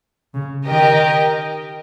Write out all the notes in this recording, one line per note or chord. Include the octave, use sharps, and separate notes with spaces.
C#3
D#3 G4 A#4 D#5 G5